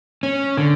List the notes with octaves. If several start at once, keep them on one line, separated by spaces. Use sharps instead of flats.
C#4
D3